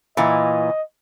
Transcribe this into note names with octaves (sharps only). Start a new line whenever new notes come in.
A#2 E3 D#5